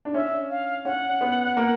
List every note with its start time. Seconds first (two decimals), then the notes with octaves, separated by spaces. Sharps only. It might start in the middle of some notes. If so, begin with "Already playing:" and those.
0.05 D4
0.14 C#4 E5
0.50 F5
0.85 C#4 F#5
1.21 B3
1.57 A#3